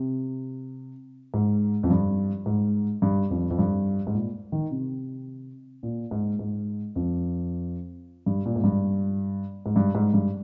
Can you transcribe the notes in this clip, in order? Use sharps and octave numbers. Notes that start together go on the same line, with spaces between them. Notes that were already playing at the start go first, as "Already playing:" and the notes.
Already playing: C3
G#2
F2
G2
G#2
G2
F2
F2
G2
G#2
A#2
D#3
C3
A#2
G#2
G#2
F2
G2
A#2
G#2
G2
G#2
G2
G#2
G2